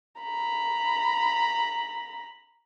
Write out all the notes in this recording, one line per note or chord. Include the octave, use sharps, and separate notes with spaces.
A#5 B5